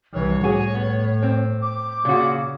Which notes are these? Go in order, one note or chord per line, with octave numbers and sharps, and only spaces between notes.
C2 E3 C#5
A2 F#4 G#4
B3
C4
D6
A#2 C#3 F#4